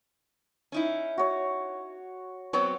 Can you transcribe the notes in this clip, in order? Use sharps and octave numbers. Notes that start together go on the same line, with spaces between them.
C#4 D#4 E4
F#4 C#5
F#3 B3 C4 C#5